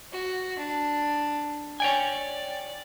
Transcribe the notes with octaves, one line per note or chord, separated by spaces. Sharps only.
F#4
D4
C#5 D5 G5 G#5